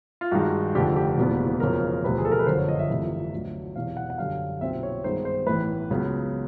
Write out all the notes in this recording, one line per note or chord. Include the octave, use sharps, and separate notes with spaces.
F4
G2 D#3 G#3 F#4
F1 F2 D3 G4
G4
F#1 E2 B2 G#3 B3
F2 C#3 F#3 A#4
E1 D2 C3 F3 B4
G#4
A4
A#4
B4
G1 F#2 D3 F3 C5
C#5
D#5
E5
G1 F2 C3 E3 A3
D2 D3 F#3
E1 E2 C3 F5
F#5
F#5
F#2 D3 G3 F5
B1 A#2 G3 C4 E5
C#5
G2 D#3 G#3 B3 C5
C5
A1 A2 E3 B4
C#2 C#3 F#3 B3